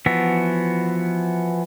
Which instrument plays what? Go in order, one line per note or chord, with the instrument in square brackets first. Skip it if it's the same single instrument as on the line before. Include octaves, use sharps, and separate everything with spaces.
[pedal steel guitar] E3 F3 B3 F#4 E5